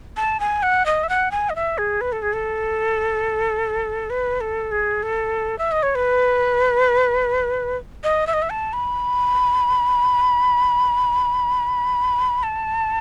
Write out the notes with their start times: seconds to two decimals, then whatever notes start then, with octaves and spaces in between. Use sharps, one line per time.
0.17 A5
0.40 G#5
0.63 F#5
0.86 D#5
1.03 E5
1.09 F#5
1.31 G#5
1.50 D#5
1.56 E5
1.78 G#4
2.01 B4
2.12 A4
2.22 G#4
2.33 A4
4.10 B4
4.41 A4
4.71 G#4
5.03 A4
5.58 E5
5.72 D#5
5.83 C#5
5.95 B4
8.04 D#5
8.27 E5
8.33 D#5
8.42 E5
8.50 A5
8.73 B5
12.43 A5